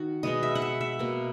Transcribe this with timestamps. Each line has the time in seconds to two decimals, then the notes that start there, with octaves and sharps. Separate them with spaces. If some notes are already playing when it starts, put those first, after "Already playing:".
Already playing: D#3 F#4
0.23 B2 G#3 B3 D#5
0.43 E5
0.55 F#5
0.62 E5
0.81 E5
0.99 B2 A#3